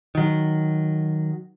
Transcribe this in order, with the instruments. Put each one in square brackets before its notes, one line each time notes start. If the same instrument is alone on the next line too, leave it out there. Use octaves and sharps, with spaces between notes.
[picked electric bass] D#3 F#3